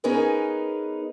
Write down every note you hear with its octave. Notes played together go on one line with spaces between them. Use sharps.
B3 C#4 D#4 G#4 A#4 B4